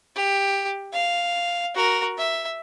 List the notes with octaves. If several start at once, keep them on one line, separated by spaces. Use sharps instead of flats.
G4
F5
F#4 A#4
E5